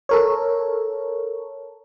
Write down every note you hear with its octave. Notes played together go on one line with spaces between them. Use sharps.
A4 A#4 C#5